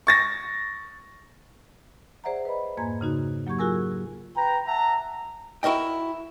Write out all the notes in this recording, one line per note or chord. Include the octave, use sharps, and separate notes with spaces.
C#6 A6 A#6
G#4 C5 D5 E5 F#5 A#5
B4 D#5 B5
F2 G#2 A#3 G#5 A#5 G#6
C#3 D#4 F#4
F#3 A#3 G4 C#6 G#6
F4 F#4 G#4 A#4 G#5 E6
B4 G5 A#5
E5 F#5 A5 A#5
E4 F#4 A#4 D#5 G5